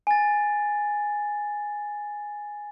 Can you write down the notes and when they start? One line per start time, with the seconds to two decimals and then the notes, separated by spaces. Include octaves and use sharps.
0.07 G#5 A6